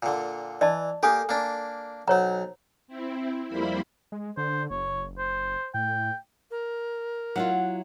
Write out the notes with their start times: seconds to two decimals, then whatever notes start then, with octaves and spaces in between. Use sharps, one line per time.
0.03 A#2 D3
0.61 E3 D5 D#5 A5
1.03 A#3 G4 A4 G#5 D#6
1.29 A#3 D4
2.08 B1 F#3 C5 C#5 A#5
2.88 C4 E4
3.48 F2 G3 A#3 E4 C5 B5
4.12 G#3
4.37 D3 C5
4.71 F#1 C#5
5.18 C5
5.74 A2 G5
6.51 A#4
7.36 F#3 E4 F4 F#5